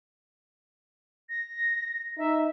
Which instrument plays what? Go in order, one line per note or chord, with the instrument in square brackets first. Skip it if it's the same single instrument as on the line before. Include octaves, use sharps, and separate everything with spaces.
[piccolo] A#6
[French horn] D#4 [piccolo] E5